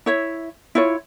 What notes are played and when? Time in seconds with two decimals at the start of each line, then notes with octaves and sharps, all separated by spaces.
0.06 E4 C#5 E5
0.75 E4 F4 C#5